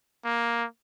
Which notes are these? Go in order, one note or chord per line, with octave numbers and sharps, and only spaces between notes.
A#3